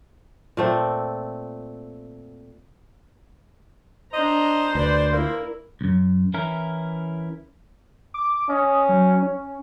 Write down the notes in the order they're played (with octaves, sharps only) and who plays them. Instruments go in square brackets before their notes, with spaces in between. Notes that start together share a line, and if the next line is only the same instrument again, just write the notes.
[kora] A#2 A3 C4
[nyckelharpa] D4 A#5 [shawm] C5 [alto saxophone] D#5
[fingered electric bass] D2 [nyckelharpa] B4 D5
[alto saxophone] A#3 [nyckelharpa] E4 A#4
[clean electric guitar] C#2 F#2
E3 C#4 E4 A#4
[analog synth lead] D6
[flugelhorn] C#4 [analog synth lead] D#5
[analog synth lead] F#3
C#4